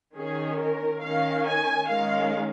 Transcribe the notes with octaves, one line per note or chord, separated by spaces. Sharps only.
D#3 C#4 G#4
A#4
D#3 C#4 F5
G#5
D#3 G#3 C#4 F5